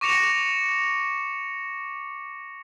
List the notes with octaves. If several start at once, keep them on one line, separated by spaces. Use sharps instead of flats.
C#6 D6 A#6 C#7 F7